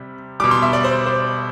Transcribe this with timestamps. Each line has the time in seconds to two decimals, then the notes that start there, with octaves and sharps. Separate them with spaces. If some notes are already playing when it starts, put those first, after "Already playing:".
Already playing: C3 G3
0.40 B2 G3 D6
0.51 C6
0.62 E5
0.73 D5
0.84 C5
1.06 C5